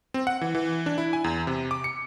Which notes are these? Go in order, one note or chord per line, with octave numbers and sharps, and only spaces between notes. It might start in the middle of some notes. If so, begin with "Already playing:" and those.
C4
F#5
E3
E3
D4
E4
G#5
E2
C3
D6
C#7